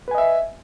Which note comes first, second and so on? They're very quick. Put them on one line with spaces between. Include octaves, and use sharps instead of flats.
B4 G#5 D#5 E5